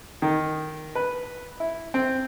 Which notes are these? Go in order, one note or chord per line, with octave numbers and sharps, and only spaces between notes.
D#3
B4
E4
C4